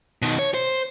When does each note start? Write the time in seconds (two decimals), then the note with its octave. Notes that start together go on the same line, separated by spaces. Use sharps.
0.22 B2 D#3
0.39 C#5
0.54 C5